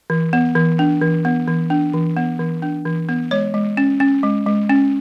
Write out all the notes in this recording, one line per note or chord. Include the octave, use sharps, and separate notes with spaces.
E3
B3
E3
D4
E3
B3
E3
D4
E3
B3
E3
D4
E3
B3
G#3 C#5
G#3
C#4
C#4
G#3
G#3
C#4